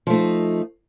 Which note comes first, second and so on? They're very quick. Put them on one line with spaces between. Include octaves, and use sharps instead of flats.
F3 A3 D#4